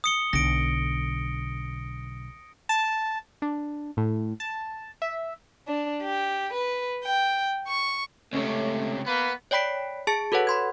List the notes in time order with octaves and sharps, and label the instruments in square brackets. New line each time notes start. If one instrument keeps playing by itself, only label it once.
[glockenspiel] D#6 C#7 G7
[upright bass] B1 D3 [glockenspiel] A#6 D7
[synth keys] A5
D4
A2
A5
E5
[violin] D4
G4
B4
G5
C#6
[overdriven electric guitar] C#2 C3 [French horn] A3 [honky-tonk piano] C#4 C#5
[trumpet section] A#3 B4 [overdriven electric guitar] B3
[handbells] C#5 D5 G5 B5 B6 D7
G#4 A5 A6 C#7
F#4 A4 B4 C#5 F#5
B5 C6 G#6